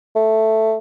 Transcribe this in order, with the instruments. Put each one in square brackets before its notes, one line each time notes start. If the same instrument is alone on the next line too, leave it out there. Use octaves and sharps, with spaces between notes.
[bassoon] A3